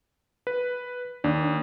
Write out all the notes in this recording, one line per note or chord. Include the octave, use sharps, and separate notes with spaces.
B4
D#2 D4